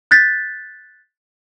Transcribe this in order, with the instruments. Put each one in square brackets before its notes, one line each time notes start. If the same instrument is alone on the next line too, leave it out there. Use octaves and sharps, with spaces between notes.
[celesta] F#6 G6 A6 B6